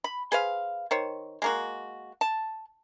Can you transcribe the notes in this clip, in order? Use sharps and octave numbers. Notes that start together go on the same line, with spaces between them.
B5
G#4 B4 C5 F5
D#3 C5 C#5
G#3 A#3 F#4
A5